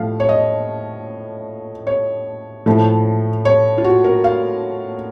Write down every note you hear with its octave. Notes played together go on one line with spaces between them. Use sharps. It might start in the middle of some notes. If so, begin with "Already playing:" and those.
Already playing: A2 F3 A3 F5
C#5
D#5
C#5
A2 F3 A3
C#5
F4
F#4
A#4
F5